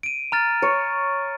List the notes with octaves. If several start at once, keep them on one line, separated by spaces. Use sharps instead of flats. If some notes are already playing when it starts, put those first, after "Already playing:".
D7 D#7
A#5 F6 A6
C#5